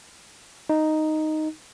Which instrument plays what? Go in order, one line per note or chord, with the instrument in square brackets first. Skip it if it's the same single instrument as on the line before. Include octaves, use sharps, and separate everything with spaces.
[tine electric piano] D#4